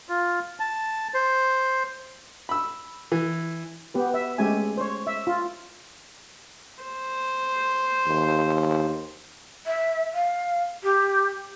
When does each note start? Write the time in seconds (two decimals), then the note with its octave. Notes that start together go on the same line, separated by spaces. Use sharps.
0.09 F4
0.60 A5
1.14 C5
2.49 B5 E6
3.12 E3
3.94 B3 G4 B4
4.14 E5
4.38 G#3 A3 C#4 G4 E5 G#5
4.77 C5 C#5
5.07 E5
5.27 F4
6.82 C5
8.07 D#2
9.66 E5
10.14 F5
10.83 G4